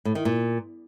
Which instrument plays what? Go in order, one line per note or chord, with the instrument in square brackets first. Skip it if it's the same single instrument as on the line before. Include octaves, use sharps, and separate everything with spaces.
[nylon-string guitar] A2
D#3
A#2